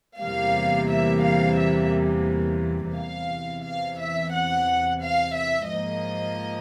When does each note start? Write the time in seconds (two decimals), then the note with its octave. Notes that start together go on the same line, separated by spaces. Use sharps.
0.20 E2 C3 E3 G3 A#3 F5
0.89 E5
1.23 F5
1.58 E5
2.95 E2 C3 E3 F5
3.64 F5
3.99 E5
4.32 F#5
5.02 F5
5.35 E5
5.69 G#2 F3 A#3 D#5